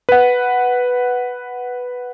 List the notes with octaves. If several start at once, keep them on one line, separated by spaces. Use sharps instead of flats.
B4 F#5